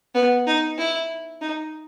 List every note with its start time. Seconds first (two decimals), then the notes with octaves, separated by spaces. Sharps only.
0.15 B3
0.47 D#4
0.78 E4
1.41 D#4